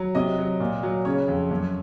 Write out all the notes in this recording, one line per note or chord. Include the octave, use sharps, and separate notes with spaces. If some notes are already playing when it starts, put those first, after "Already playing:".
Already playing: F#3
C3 D#5
F#3
A#2
F#3
C#3 C#5
F2
F#2